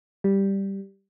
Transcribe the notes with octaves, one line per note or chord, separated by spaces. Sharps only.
G3